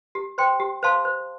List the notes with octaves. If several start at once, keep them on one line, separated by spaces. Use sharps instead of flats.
G4
C5 G5 C6
G4
C5 F5 A5 C6
C5